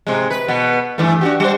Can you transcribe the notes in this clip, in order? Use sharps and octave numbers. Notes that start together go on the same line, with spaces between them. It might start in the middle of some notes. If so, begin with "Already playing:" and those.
G#2 C3 G#3
B4
B2 B3
G2 E3 A3
D4 F#4 G4
G3 C5